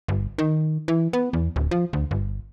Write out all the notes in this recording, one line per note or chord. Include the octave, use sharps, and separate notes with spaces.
G1
D#3
E3
B3
E2
D1
F3
D2
G1